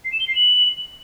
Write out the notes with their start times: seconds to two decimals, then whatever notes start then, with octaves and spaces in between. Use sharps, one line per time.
0.05 C7
0.12 E7
0.20 G7
0.28 C7
0.35 F#7